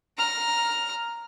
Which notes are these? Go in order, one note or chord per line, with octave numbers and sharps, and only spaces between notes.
A#5 F6